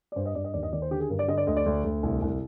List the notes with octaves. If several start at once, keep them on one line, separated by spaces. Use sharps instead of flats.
D5
G2 C5
D#5
G2 D5
D#5
D#2 D5
D#5
D#3 D5
C5
D3 G4
G#4
G2 A#4
D5
D3 D#5
D5
D2 D#5
D5
D2
D2
C2
C2